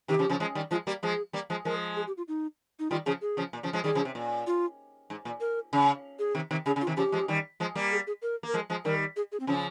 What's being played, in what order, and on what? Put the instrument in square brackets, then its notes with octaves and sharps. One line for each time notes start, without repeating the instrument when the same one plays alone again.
[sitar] C3 D#3 [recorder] G4
[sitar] C#3 F3
C#3 F3
F3 G#3
D#3 G3
[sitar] F3 G#3 [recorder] F4
[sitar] G3 A#3 [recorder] G4
[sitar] F3 G#3 [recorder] G#4
[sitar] G3 A#3
F3 G#3
[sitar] F3 G#3 [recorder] A#4
[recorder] G#4
G4
F4
D#4
D#4
[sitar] D#3 G3 [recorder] F4
[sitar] C#3 F3 [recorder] G#4
[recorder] G#4
[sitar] C#3 F3
A#2
C#3 F3
F3 G#3
[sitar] D#3 G3 [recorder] G#4
[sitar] C#3 F3
C3
A#2
[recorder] F4
[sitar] G#2
A#2
[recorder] A#4
[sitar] C#3
[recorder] G#4
[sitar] C3 D#3
C3 D#3
[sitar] C#3 [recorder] G#4
[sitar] C#3
[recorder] F4
[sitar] C3 D#3
[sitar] C#3 F3 [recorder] G4
[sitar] F3 G#3
D#3 G3
F3 G#3
G3 A#3
[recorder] G#4
G#4
A#4
[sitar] A#3 [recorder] A#4
[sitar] F3 G#3
F3 G#3
[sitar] D#3 G3 [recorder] A#4
[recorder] G#4
G#4
C4
[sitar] C#3 F3 [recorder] C#4